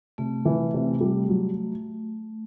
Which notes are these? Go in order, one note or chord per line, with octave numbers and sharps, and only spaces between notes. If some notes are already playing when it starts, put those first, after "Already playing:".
C3 A3
E3
C3
G3
F#3